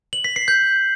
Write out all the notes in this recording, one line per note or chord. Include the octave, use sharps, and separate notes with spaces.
F#7
B6
C7
G6